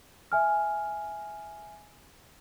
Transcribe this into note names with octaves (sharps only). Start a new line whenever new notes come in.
E5 G#5 F6